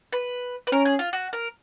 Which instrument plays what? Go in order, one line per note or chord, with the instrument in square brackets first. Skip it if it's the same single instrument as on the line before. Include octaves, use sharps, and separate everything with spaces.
[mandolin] B4
B4
[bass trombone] C#4 [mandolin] A#4
[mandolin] G#4
F4
F#4
A#4